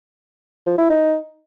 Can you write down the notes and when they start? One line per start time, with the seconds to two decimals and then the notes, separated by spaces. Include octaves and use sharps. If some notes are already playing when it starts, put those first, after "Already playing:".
0.66 F3
0.78 E4
0.90 D#4